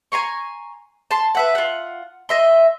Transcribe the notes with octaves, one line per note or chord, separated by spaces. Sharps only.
G#5 A#5 C6 C#6
A5 C6
B4 E5 F#5
F4 F#5
D#5 E5 C6